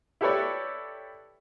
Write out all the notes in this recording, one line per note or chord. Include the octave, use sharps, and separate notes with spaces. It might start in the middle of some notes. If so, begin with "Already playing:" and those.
E4 G4 A4 B4 C#5 D5